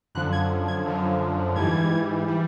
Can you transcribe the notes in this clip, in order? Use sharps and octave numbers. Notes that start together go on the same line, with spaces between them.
F#2 D3 F3 F#6
G#6
G#6
F#2 D3 F3
G#2 E3 G3 G#6
E3 G3